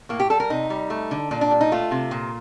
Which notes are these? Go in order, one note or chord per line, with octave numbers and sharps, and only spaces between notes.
A2 A#3
G4
G3 A4
A#4
C3 D#4
G3
A3
D3
A#2 D4
D4
G3
D#4
A3 F4
C3
A#2